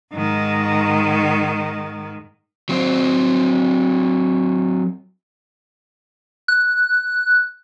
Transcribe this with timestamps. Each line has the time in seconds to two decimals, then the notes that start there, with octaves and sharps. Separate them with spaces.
0.14 G#2 D#3
2.69 F#3 C4 C5
6.48 F#6